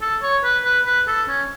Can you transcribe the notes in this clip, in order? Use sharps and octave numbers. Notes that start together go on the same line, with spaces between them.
A4
C#5
B4
B4
B4
A4
C#4